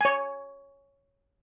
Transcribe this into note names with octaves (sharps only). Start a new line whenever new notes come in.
C#5 G#5